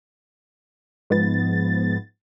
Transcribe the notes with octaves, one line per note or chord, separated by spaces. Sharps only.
G#2 F3 B3 A6